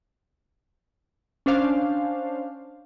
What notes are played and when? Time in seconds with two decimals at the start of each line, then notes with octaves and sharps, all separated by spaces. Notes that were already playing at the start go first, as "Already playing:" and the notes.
1.46 C#4 D4 C5 F5